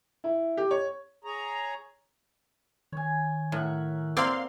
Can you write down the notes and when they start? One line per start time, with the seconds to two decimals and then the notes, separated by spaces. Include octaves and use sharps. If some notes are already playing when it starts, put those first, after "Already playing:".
0.24 E4
0.57 G4
0.71 C#5
1.24 G#4 C#5 A#5
2.92 D#3 C#5 G#5
3.52 A2 A#4 E5 F#5
4.17 A#3 C4 D5 F5 C6